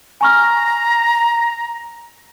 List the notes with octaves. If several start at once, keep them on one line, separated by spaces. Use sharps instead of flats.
G#5 A#5 C#6 F6